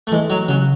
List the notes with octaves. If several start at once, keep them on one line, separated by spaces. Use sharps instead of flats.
A3
E3 G#3
F#3
C#3 F#3